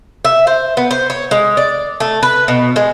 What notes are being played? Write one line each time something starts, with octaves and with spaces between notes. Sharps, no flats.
E5
C5
B3
C5
C#5
G#3
D5
A3
B4
B2
G#3